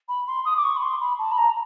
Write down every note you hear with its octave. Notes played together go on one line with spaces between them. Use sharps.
B5
C6
D#6
D6
C#6
B5
C6
B5
A5
B5
A#5